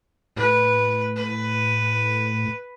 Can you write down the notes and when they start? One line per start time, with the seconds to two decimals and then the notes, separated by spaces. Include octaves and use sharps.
0.36 A2 B4
1.16 B4